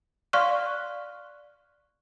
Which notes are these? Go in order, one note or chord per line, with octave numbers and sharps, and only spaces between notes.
D5 F5 C6 C#6 F6 F#6